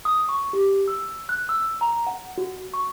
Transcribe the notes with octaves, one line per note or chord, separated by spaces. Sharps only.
D#6
C#6
G4
E6
F#6
E6
A#5
F#5
F#4
C#6